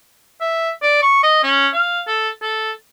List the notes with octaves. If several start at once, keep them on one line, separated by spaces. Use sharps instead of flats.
E5
D5
C#6
D#5
C#4
F5
A4
A4